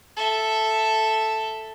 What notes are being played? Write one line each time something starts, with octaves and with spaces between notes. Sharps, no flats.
A4 E5